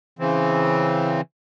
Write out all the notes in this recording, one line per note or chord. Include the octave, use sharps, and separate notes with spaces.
C#3 E3 C4